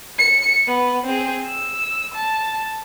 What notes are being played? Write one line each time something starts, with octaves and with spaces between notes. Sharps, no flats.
C#7
B3
C4 G#4
E6
A5